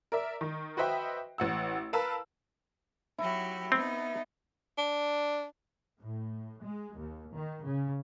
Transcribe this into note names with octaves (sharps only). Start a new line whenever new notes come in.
A#4 D5 E5
D#3
F#4 B4 C5 D#5 E5 G5
A1 F#5 E6
A#4 B4 F5 A5 E6
F#3 E4 F#4 G4
B3 C4 D#4
D4
A2
G#3
D#2
D#3
C#3